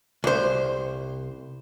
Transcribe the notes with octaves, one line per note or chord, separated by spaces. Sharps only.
C2 C5